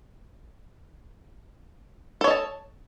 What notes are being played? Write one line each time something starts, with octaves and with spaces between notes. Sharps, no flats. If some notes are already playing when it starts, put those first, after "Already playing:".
A4 C#5 D#5 A5